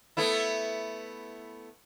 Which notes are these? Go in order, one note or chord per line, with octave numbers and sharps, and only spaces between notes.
A3 B3 E4